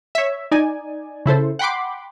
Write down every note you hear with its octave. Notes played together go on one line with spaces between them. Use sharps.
C#5 E5
D#4 D5 G#5
C#3 E4 A4 C5
F#5 G5 B5 C6 D6